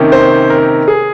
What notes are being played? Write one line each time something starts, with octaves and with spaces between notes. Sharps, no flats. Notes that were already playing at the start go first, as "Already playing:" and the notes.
Already playing: C3 D#3 A#3 C#4
C5
A#4
G#4